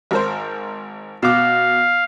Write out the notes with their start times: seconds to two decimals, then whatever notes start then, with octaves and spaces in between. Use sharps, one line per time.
0.11 G#1 A#4 C5
1.23 B2 F5 D6